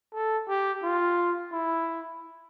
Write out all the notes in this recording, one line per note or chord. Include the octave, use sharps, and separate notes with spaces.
A4
G4
F4
E4